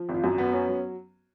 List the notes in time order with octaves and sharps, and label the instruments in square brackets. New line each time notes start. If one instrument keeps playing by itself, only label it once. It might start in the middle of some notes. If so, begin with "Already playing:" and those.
Already playing: [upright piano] F3
G#1
[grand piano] F4
[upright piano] F#2 [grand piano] F#4
[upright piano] B3
C#4
F#3